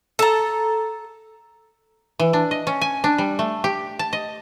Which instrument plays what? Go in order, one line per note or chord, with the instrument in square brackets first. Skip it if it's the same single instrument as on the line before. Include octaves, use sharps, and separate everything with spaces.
[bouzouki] A4 A#5
[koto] E3
D4
D#5
C#4
G#5
D4
G3
A3
G4
A5
D#5